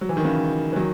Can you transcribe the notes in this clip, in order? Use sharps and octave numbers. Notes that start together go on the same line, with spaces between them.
F#3
E3
D#3
C#3 E3
E3
D#3 F#3